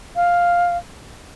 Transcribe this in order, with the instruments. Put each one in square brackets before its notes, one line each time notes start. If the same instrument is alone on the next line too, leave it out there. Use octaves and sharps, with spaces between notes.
[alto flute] F5